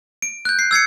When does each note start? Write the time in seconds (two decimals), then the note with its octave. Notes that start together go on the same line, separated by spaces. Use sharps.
0.22 D7
0.45 F#6 G6
0.59 C7
0.71 E6 G#6 C7 C#7